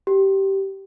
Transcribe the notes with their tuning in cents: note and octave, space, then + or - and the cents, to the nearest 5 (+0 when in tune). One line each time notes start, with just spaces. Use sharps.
G4 -15